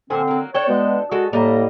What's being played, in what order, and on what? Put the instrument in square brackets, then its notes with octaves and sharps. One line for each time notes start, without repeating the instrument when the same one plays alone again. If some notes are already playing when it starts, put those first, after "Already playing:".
[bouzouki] A#2 C5 G#5 [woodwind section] D3 C4
[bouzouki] F#3 A#3
[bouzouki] D4 A4 G5 [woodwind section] C#5
[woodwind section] B2 G#3 B3
[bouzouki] G#3 A4 [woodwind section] F#4
[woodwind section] A2 A#3 [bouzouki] G3 D#5 A#5